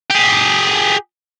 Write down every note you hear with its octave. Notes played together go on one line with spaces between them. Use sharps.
G4 G#4